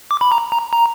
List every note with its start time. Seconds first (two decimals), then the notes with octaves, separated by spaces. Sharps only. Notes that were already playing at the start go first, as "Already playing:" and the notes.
0.11 D6
0.21 B5
0.32 A#5
0.52 A#5
0.73 A#5